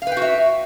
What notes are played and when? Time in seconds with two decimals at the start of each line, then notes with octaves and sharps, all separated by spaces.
0.02 F5
0.07 B4
0.12 G5
0.17 F#4
0.22 E5